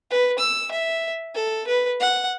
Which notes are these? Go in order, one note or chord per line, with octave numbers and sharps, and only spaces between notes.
B4
E6
E5
A4
B4
F#5